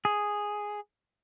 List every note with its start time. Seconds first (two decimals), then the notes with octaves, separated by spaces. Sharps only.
0.05 G#4